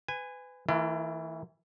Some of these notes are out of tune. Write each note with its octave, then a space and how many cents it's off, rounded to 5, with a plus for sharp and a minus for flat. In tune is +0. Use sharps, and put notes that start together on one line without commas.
B4 +30 G#5 -15
E3 -25 A3 +45 E4 +40